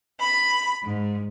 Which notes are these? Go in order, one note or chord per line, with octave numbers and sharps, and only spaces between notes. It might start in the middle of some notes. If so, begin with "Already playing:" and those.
B5
G#2